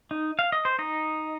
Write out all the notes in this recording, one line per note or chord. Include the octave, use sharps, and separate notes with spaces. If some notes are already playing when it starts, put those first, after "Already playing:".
D#4
F5
D#5
C5
D#4 D#5